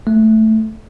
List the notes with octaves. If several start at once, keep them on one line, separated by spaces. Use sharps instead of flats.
A3